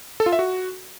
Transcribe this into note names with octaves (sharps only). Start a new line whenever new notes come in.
A4
F4
E5
F#4